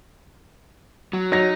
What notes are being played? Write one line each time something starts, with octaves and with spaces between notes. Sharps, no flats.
F#3
F#3 D#4 A#6